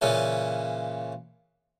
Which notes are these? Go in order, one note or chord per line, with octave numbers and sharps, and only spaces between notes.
A#2 C#3 E3